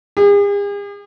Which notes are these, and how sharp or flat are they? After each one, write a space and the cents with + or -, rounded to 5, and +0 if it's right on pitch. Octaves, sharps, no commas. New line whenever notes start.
G#4 -45